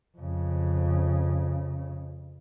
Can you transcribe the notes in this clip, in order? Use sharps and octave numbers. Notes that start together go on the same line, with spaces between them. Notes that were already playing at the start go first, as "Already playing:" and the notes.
F2 C#3